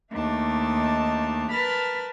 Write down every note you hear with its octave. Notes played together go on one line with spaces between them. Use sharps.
D#2 A3 D4 D#4 A5
A#4 B4 A5 B5 F6 A6